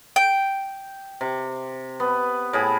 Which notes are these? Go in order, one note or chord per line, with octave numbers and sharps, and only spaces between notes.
G5
C3
B3
A2 G#4 B5